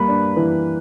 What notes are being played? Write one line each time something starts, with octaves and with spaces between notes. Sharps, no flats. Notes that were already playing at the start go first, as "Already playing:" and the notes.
Already playing: G3 A#3 B4
D4
E3